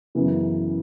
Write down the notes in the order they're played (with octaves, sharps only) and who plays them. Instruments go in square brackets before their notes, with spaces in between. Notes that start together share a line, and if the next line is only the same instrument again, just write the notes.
[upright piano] F#2 C#3 E3 B3